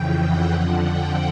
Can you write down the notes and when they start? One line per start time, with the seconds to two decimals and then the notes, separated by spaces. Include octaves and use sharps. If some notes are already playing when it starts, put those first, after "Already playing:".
Already playing: F2 C#3 E3 G5
0.23 F#5
0.54 F2 D3 F3 F#5
0.85 G5